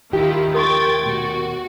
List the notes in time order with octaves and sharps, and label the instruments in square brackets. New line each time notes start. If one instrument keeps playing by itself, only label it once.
[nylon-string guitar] D#2 G4 [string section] D#3 E4 F4
[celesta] A#4 C6 C#6 [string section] G5 G#6 A6
[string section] B2 F#4